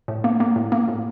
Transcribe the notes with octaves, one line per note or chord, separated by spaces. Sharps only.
A2
A#3
A#3
A2
A#3
A2